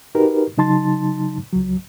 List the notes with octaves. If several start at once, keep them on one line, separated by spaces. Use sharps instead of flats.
D#4 F#4 G4 A#4 B4
C#3 F#3 D#4 A5 C6 A6
C#2 F#3